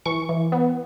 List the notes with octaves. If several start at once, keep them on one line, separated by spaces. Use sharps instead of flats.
E3 C#6
E3
B3